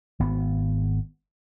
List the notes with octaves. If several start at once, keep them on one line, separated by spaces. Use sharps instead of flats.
G#1 B3